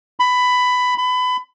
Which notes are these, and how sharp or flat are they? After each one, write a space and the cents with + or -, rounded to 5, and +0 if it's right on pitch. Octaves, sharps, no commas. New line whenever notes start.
B5 +15
B5 +25